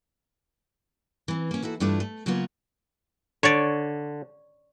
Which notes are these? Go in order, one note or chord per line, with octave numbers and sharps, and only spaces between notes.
E3 C4
A#3 C#4
A#3 E4 F#4 A4
G2 E3 A3 D4 E4 F4
A3
C#3 F#3 A#3 B3 F4 F#4
D3 C#5 D5